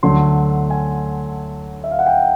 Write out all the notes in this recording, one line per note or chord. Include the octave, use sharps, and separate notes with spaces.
D2 D3 F#3 A3 C6
G#5
E5
F5
F#5
G5